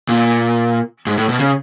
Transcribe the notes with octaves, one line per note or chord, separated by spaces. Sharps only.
A#2
G#2
A2
B2
C#3